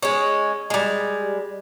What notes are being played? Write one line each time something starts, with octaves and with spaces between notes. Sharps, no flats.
G#3 C#4
G3 G#3